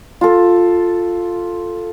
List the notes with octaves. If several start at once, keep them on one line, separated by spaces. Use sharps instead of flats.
F4 A4